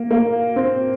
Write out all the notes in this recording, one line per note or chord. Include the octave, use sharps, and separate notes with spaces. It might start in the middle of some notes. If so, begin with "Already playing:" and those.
Already playing: A#3
A#3
C4